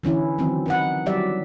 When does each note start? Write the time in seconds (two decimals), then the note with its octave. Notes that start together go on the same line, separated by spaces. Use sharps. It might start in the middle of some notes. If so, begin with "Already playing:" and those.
0.03 D3 E3 C#4 E4
0.38 D#3 E3 F#3 C4
0.66 D#4 B4 F#5
1.06 F#3 G3 G4 D5 E5